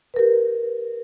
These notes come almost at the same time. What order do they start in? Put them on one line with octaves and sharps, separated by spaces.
B4 A#4 G4